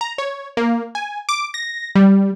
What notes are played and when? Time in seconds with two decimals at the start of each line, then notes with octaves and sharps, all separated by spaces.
0.01 A#5
0.18 C#5
0.57 A#3
0.95 G#5
1.29 D6
1.54 A#6
1.95 G3